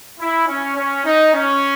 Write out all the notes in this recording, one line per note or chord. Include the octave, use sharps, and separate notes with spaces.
E4
C#4
C#4
D#4
C#4